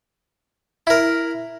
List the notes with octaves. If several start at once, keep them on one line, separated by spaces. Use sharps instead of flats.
E4 A#4